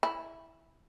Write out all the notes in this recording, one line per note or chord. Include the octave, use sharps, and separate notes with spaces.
E4